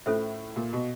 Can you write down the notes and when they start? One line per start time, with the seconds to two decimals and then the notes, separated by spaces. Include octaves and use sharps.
0.06 A2 C#4 F4 A4 C5 E5
0.56 A#2
0.73 B2